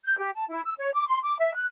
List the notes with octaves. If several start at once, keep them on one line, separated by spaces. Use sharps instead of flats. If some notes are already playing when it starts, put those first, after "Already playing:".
G6
G4
A5
E4
E6
C#5
D6
C6
D6
E5
F#6